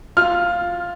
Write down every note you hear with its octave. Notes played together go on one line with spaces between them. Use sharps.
F4 F6